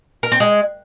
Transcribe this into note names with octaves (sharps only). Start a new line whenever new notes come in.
A#4
C4
G#3